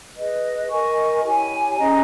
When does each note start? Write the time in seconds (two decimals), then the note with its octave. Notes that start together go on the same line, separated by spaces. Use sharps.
0.15 G#4 B4 D#5
0.69 A#4 D#5 G#5 C#6
1.24 E4 G4 C#5 G#5
1.77 C#4 G#4 D#5 A#5